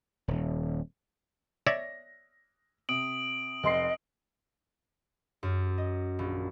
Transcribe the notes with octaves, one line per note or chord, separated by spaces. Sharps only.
D#1
C#5 D5 E5 A#6
C3 D#6 D7 F#7
F1 D#5 C6 C7
F#2
D#5
A#1